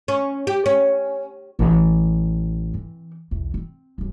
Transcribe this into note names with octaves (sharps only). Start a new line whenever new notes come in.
C#4
G4
C#4
A1
E3 C4
B1 E2
C4
D1 F#2